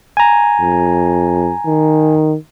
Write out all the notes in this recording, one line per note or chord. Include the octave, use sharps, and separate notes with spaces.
G#5 A#5
F2
D#3